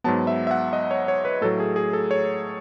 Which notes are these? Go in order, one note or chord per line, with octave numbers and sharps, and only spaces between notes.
G#2 F#3 B3 A5
E5
E5
F#5
D#5
C#5
C#5
B4
A2 F#3 A3 A4
G#4
G#4
A4
C#5